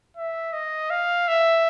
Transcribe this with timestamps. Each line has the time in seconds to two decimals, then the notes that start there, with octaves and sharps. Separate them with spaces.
0.17 E5
0.53 D#5
0.90 F5
1.28 E5